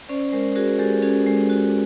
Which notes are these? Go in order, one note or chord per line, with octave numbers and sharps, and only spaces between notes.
C#4 C5 D5
G#3 A#4 C5
F#4 G#4 A#4
G#3 G4 A4
C#4 F#4 G#4
G#3
F#4